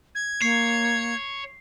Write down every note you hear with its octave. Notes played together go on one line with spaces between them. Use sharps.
G#6
A#3 C#5 C7